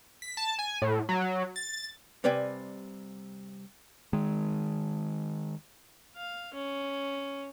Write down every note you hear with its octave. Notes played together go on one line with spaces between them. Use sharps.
B6
A5
G#5
A2
F#3
A6
C3 G3 B4 D5 G5 G#5
D#3 G#3
F5
C#4